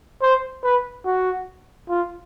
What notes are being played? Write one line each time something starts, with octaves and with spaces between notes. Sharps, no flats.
C5
B4
F#4
F4